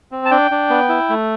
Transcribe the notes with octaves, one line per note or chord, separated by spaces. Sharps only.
C4
A5
D4 G5
D4
B3
E4
A3